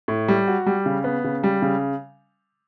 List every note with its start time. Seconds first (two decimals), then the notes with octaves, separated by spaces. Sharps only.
0.08 A2
0.28 G3
0.48 F#4
0.66 G3
0.86 C#3
1.04 B3
1.24 C#3
1.44 G3
1.62 C#3